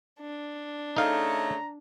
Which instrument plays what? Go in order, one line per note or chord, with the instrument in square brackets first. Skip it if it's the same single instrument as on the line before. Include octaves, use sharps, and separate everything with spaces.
[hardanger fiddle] D4
[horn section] C#3 A3 [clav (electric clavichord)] D#4 F5 [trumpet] A#5